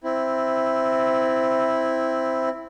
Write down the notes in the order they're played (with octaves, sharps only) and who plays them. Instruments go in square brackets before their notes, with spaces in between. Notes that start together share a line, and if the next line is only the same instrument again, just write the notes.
[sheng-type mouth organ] C4 E4